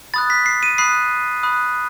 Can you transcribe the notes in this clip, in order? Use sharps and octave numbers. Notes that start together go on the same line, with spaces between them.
B5 D#6 F#6 A6
B6
C7
D#7
B5 D#6 F#6 C7
B5 D#6 F#6